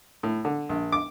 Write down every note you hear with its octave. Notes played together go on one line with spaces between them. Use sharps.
A2
D3
A#1
D6